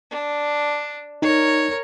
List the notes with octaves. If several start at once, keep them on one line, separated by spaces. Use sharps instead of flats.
D4
D#4 A#4 C#5